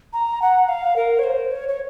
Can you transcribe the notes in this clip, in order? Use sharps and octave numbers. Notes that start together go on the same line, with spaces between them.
A#5
F#5
F5
A#4
C#5
C5
C#5
C#5